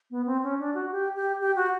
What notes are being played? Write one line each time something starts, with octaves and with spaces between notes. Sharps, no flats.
B3
C4
C#4
D4
F#4
G4
G4
G4
F#4